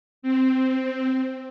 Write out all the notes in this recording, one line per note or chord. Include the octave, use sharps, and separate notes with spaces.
C4